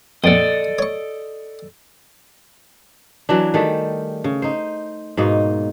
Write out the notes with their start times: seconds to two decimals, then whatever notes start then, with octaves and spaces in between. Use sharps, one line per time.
0.24 A#1 F2 A4 D5 D#5
0.79 C#5 C#6
3.29 E3 F#3 D4
3.54 D#3 G3 A3 G#4
4.24 C#3
4.42 D#4 C5
5.17 G#2 B2 A#3 D#4